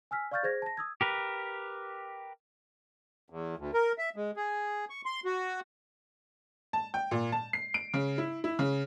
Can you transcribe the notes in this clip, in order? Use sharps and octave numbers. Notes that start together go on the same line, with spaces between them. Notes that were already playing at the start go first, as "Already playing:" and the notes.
G#5 E6 F6 B6
D5 F5 C#6 F6 G6 A6
G#4 C5 G#6 A#6
A5 A#6
D#6 E6 G#6
G4 A#4 B4
E2
D2
A#4
E5
G#3
G#4
C#6
C6
F#4
A5
G5
A#2
A5
C7
D7
C#3
E4
E4
C#3